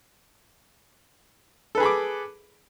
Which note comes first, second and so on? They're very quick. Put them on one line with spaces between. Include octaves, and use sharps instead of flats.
A4 B4 G#4 B5 D6